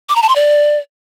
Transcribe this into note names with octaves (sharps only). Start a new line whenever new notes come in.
D6
A#5
A5
C6
D5